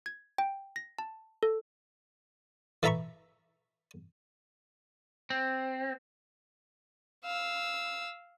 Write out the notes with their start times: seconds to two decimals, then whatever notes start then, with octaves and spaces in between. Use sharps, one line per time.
0.06 G#6
0.38 G5
0.76 A#6
0.99 A5
1.43 A4
2.83 E3 A4 E5 A#5 B5 C#6
5.30 C4
7.24 F5 E6